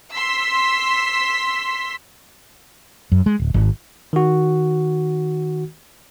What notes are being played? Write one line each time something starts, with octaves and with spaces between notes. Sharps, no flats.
C6 E6 B6
F#2
G#3
D1
G#1
D#3 F#4